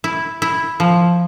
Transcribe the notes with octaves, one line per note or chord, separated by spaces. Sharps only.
E4
E4
F3